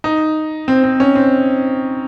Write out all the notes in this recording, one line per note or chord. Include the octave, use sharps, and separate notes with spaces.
D#4
C4
C4
C#4
C4